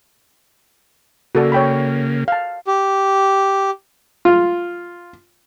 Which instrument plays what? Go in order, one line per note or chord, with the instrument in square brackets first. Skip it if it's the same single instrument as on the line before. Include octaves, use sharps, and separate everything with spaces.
[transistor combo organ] C#3 A#3 [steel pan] F#4 A4 D5
[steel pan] C#5 G5 B5
F5 A5
[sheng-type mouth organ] G4
[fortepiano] F4